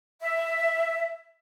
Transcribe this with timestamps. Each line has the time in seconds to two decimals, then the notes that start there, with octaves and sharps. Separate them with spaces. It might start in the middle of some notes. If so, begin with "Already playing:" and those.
0.21 E5